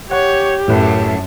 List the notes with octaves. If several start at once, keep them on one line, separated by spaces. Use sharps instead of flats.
G4 C#5 F#5
F#2 A2 B4 E5 A5